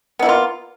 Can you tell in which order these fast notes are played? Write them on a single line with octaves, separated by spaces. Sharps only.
B3 E4 A#3 F4